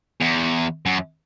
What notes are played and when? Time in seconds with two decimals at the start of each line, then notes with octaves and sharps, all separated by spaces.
0.21 E2
0.86 F#2